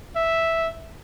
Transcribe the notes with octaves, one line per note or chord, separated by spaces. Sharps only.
E5